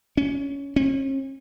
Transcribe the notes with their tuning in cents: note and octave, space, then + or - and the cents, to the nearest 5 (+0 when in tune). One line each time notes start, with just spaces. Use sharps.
C#4 +15
C#4 -40